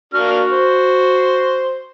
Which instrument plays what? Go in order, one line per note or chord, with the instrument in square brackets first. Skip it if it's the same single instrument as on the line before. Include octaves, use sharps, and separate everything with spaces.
[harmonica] A#3 D4 F6 [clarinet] F#4
[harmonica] C5